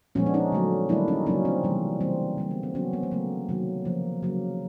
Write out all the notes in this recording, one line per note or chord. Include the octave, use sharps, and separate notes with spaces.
A#2 F3 G#3 B3 C#4
D4
C#4 D#4
D3 F#3 A3
D#3 G3 A#3 D4 E4
C#4 D#4
C#3 F#3 A#3 C#4 D#4
C4 D4
C3 E3 G3 A#3
C#3 E3 G3 A#3 C4
D3 G3 A#3
B3
C4
C#3 F#3 A#3 B3 C#4
A#3 C4
A#3
C#3 F#3 A3 B3
C3 D#3 F#3 A#3
C#3 F3 A#3
C#3 F#3 A#3